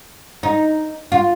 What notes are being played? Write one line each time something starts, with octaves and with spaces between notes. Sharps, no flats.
D#4
F4